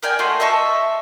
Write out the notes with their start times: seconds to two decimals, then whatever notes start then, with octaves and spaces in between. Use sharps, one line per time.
0.03 A#4 D5 G5 G#5
0.19 A3 F#4 D#5 C6
0.40 D#5 E5 A5 C#6